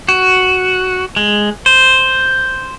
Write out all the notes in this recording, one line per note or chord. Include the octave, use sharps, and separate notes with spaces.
F#4
G#3
C5